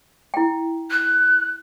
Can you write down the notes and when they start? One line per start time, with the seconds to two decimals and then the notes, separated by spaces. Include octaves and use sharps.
0.34 E4 G5
0.91 F#6